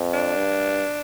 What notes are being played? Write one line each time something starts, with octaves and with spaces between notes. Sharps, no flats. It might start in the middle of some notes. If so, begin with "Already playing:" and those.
Already playing: F2
D4
G2